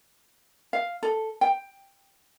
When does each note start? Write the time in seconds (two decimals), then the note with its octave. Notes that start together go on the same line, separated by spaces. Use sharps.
0.73 F5
1.03 A4
1.41 G5